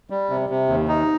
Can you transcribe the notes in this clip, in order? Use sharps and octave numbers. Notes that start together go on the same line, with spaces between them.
G3
C3
C3
D#2
D#4